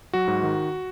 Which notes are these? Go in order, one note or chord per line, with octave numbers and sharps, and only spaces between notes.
F#3 F#4
G#2
D#3